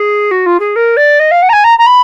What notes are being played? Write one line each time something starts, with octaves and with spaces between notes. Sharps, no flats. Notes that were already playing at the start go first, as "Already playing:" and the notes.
Already playing: G#4
F#4
F4
G#4
A#4
D5
D#5
F5
F#5
A#5
G#5
A#5
A#5
B5